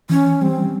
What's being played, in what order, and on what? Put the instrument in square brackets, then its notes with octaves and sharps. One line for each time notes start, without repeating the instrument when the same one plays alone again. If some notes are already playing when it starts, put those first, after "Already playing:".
[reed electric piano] E3 [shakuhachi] C#4
[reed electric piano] G3 [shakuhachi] C4